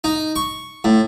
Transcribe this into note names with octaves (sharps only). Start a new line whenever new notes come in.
D#4
C#6
A2